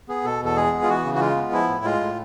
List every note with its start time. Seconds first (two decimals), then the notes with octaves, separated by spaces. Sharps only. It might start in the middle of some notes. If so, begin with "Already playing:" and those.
0.08 B3 G#4
0.25 B2 A4
0.41 E2 A4
0.56 G#3 G#4
0.72 B3
0.83 F4
0.89 E3 F#4
1.05 C#3
1.15 F#4
1.20 G#3 F4
1.36 B3
1.52 F3 E4
1.68 A2
1.85 G#3 F4
2.00 A2